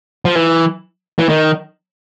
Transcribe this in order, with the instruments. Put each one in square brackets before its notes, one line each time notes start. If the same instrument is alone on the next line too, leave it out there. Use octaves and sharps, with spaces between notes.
[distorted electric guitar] F3
E3
E3
D#3